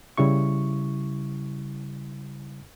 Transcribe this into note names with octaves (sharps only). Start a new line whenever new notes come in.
C#3 G3 E4 C#6